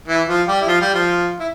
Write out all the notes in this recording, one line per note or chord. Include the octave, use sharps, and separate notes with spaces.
E3 E4
F3 F4
G3 G4
E4
F3 F4
G3 G4
F3 F4
E4